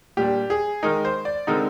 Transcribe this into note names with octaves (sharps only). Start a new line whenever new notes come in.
A#2 G3 D4 G4
G#4
D#3 G#3 D#4 A#4
C5
D5
D3 G#3 C4 D#4 A#4